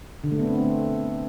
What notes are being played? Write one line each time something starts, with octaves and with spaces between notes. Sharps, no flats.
D3
A3
B3
C4
A3